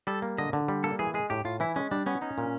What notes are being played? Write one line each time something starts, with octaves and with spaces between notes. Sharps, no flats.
G3 A4
A#3
D3 D#5
D3
G3
A#3 A4
E3 G#4
G#3 G#4
A2 G4
A2 F4
E3 E4
G#3 C#4
G3 D4
B3 C#4
C#4 D#4
A#2